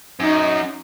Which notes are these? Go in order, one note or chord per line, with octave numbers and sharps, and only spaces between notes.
F#2 D#4